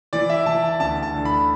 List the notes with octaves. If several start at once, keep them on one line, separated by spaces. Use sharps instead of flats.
E3 D5
E5
E3 A5
A5
D2 A5
A5
D3
B5